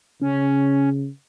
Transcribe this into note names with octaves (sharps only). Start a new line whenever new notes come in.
C#3 C#4